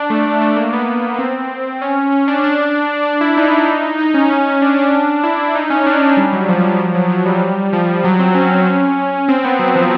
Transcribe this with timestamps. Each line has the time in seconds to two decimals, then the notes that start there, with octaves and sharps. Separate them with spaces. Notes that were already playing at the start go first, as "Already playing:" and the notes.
Already playing: D4
0.10 A3
0.25 A3
0.41 A3
0.56 A#3
0.73 B3
1.19 C4
1.81 C#4
2.12 C#4
2.28 D4
2.44 D4
3.05 D4
3.21 E4
3.37 D#4
3.99 D#4
4.14 C#4
4.30 C#4
4.46 C#4
4.62 D4
4.77 D4
5.23 E4
5.55 D#4
5.70 C#4
5.87 D4
6.17 G3
6.33 F#3
6.49 F3
6.64 F#3
6.79 F3
6.95 F#3
7.10 F#3
7.26 G3
7.73 F3
8.04 F#3
8.19 C4
8.35 C#4
9.28 C4
9.44 B3
9.59 F#3
9.75 F3